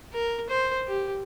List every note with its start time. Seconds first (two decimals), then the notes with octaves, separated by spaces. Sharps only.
0.13 A#4
0.50 C5
0.87 G4